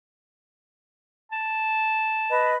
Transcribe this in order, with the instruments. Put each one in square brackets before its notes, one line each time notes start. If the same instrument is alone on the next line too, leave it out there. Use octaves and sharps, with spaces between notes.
[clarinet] A5
[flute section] B4 D#5 B5